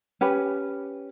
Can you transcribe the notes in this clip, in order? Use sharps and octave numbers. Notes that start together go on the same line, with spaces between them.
C#4 G4 B4